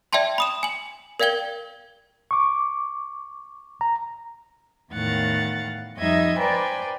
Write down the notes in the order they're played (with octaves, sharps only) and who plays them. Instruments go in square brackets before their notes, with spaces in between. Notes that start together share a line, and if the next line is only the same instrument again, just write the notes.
[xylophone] D5 E5 G5 A5 C6
B5 D#6 E7
G#5 F#7
A#4 D5 F5 G5 G#6 G7
[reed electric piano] C#6 D6
A#5
[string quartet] E2 A2 D#3 F5 F#5 A6
F2 G3 D#4 D#5 E5 G#6
B4 C5 D5 G5 G#5 A#5